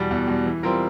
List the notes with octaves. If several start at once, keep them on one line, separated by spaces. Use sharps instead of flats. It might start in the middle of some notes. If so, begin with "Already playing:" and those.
Already playing: E2 B2 G3
E2
B2 G3
E3
G3 C4 F4 A#4